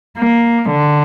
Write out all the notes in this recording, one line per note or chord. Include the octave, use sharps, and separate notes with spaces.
A#3
D3